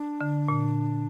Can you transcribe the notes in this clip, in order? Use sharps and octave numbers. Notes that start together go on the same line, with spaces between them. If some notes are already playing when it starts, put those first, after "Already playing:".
Already playing: D4
D3
A#2